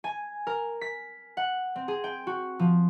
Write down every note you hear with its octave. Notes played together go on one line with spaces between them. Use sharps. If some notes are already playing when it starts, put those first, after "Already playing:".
G#5
A#4
B6
F#5
C4
G#4
G5
F#4
F3